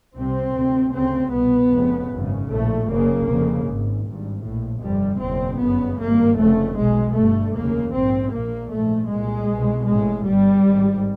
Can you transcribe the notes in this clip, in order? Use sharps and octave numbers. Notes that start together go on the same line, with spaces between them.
C2 C3 C4
D2 C3
D2 C#3 C4
C2 B2 B3
F1 F2 C#3
G#1 F#2 C#3
A#1 A2 A3
F#1 F#2 C#3 A#3
F1 F2 C#3
G#1 G#2
G#1 G2
A#1 A2
G1 F2 C3 G3
F#1 E2 B2 C4
G1 F#2 C#3 B3
G#1 G2 A#3
F1 F2 C#3 A3
B1 B2 G#3
G1 G2 A3
F1 D#2 C#3 A#3
A#1 G#2 C4
A#1 A#2 A#3
A#1 G#2 A3
C2 A#2 G#3
C2 B2
A1 A2 G#3
G1 G2 G3
G#1
G#2